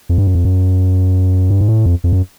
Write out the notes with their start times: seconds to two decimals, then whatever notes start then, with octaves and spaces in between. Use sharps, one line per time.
0.09 F2
0.18 G2
0.27 F#2
0.35 F2
0.45 F#2
1.50 G2
1.61 G#2
1.68 A2
1.86 F2
2.04 F2
2.13 F#2